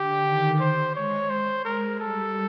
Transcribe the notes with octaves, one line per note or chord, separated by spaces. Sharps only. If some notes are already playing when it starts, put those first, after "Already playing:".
Already playing: D3 G4
D#3
C5
G#3 C#5
C5
G#3 A#4
G3 A4